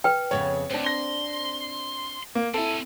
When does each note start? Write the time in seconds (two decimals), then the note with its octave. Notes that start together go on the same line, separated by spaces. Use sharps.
0.04 B4 G5
0.31 F2 C#3 B3 C#5
0.71 D2 C4 D4
0.85 C6 A#6 G7
2.35 A#3
2.54 C4 E4 A4 G#5